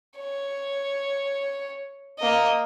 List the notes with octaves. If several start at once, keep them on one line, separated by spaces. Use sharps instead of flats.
C#5
A#3 D#5